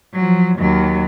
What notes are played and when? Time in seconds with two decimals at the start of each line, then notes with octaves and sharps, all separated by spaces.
0.14 F3 F#3
0.59 D#2 F#3